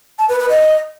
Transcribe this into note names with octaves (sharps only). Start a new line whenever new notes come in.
A5
B4
B4
D#5